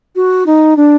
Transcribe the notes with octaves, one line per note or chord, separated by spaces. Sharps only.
F#4
D#4
D4